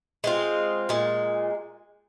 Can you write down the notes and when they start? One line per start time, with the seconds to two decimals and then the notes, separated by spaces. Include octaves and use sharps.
0.24 G#3 C4 F4
0.89 A#2 G#3